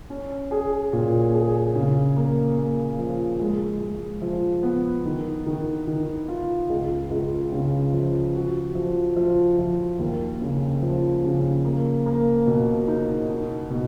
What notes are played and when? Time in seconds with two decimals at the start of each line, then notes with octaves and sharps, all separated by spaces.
0.10 C#4
0.51 G#4
0.93 A#2
1.34 G#4
1.75 C#3
2.16 A#3
2.57 A#3
2.98 F3
3.40 G#3
3.80 G#3
4.22 F3
4.63 B3
5.05 D#3
5.46 D#3
5.87 D#3
6.28 F4
6.69 C#2
7.10 C#2
7.52 C#3
7.93 F3
8.35 F#4
8.75 F3
9.16 F3
9.59 F3
9.99 D#2
10.41 C#3
10.82 F3
11.23 C#3
11.65 A#3
12.06 A#3
12.47 B2
12.88 D#4
13.29 D#4
13.70 B2